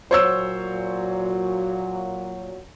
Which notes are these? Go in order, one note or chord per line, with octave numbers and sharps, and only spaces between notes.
A#2 F#3 C5 C#5 E6